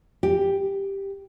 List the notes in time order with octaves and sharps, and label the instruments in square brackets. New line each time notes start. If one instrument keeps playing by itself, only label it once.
[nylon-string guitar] G4